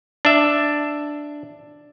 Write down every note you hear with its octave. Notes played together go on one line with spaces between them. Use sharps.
D4 E5